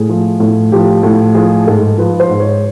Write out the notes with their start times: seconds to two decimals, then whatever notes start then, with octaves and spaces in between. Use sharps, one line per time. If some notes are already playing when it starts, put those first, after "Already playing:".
Already playing: A2 G#4
0.09 F3
0.40 A2
0.72 F3 G4
1.03 A2
1.35 F3 G#4
1.67 G#2 A4
1.98 F3 B4
2.20 C5
2.29 G#2
2.40 C#5